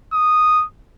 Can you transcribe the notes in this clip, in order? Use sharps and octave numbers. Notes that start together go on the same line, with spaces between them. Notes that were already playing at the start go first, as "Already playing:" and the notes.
D#6